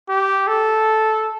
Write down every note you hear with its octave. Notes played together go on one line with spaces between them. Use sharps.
G4
A4